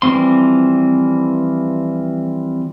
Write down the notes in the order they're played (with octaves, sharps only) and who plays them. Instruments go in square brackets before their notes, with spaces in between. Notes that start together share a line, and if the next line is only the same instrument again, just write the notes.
[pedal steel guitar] E3 F3 G3 C4 C6